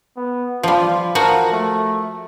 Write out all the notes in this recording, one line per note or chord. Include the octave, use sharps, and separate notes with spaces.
B3
F3 G3 F4
F3 F#4 A#4
A3